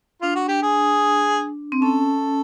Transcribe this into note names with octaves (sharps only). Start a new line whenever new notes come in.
D4 F4
F#4
G4
G#4
C4
C#4 A4